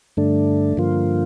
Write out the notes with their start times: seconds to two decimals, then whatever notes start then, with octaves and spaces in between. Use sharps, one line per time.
0.17 G2 D3 A3 D4
0.77 G2 D3 F3 A#3 F4